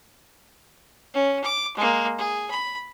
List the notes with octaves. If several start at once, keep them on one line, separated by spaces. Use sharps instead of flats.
C#4
D6
G#3 A#3
G#4
B5